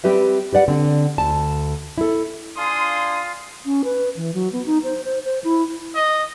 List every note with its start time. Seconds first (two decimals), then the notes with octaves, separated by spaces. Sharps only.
0.04 G3 C4 G4 B4 E5
0.53 G4 B4 D5 F#5
0.68 D3 C4
1.18 D2 A5
1.98 E4 A4
2.58 D4 F4 F5 G#5 C6 D#6
3.66 C#4
3.84 B4
4.17 E3
4.34 F#3
4.53 B3
4.66 D#4
4.84 C5
5.05 C5
5.25 C5
5.44 E4
5.95 D#5